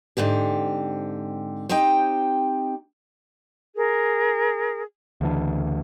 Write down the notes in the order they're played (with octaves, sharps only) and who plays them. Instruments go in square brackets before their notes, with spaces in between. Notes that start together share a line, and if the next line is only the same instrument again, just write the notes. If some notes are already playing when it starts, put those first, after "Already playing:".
[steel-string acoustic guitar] G#2 D3 C4 G4
C4 D#4 G4 D#5 G5
[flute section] G#4 A#4
[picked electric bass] D2 C#3 E3 D4